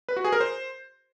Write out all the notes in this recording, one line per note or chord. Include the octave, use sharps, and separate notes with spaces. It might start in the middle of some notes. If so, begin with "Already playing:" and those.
B4
F#4
G#4
A#4
C5